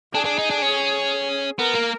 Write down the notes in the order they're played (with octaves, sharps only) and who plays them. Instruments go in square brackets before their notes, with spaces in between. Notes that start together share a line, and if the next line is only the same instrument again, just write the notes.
[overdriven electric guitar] D4 [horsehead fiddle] G#4
[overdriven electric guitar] D4
D#4
D4
C#4
[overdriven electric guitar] B3 [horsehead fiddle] A#4
[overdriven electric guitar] A#3